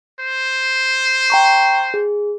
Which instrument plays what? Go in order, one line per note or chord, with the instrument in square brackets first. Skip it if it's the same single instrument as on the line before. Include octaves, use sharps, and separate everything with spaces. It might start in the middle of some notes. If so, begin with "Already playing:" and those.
[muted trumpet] C5
[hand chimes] G5 A#5 C#6
G#4